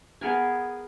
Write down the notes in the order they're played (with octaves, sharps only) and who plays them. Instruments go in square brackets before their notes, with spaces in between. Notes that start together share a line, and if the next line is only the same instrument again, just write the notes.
[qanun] B3 G#4 A#4 G#5